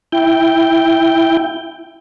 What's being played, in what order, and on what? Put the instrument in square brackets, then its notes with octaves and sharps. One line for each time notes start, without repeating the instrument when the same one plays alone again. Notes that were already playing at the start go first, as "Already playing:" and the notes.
[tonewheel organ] E4 G5